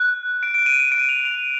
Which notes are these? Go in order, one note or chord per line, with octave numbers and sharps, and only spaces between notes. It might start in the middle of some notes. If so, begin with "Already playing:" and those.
Already playing: F#6
D7
D7
D#7
D#7
D7
F7
F7